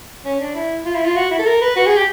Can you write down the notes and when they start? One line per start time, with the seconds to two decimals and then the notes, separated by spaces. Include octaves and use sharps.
0.25 C#4
0.40 D4
0.55 E4
0.85 F4
0.95 E4
1.05 F4
1.16 F#4
1.31 E4
1.39 A4
1.46 A#4
1.61 B4
1.76 F#4
1.86 G#4
1.96 G4